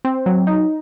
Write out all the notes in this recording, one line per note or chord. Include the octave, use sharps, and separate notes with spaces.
C4
F#3
D#4